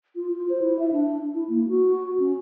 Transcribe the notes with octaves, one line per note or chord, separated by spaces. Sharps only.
F4
F4
C5
E4
E5
D4
E4
A#3
F#4
C#4